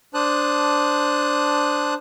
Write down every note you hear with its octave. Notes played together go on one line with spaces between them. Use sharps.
D4 C5 A5 D#6 F#6